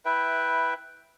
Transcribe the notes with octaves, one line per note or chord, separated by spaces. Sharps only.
E4 B4 E5 G5